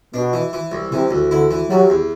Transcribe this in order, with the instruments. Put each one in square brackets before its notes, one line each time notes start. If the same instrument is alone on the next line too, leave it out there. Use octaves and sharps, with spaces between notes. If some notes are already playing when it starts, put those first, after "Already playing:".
[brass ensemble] B2 [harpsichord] D4
[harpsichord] E3
E3
C2
[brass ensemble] C3 [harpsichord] E3
[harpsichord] D2
[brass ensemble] D3 [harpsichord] E4
[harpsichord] E3
[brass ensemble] F#3 [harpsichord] G3
[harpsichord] E2